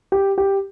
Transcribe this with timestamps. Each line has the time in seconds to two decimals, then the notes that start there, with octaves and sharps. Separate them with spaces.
0.12 G4
0.38 G4